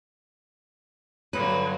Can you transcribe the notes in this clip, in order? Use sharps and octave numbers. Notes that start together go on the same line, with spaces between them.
G2 D3 F#3 B4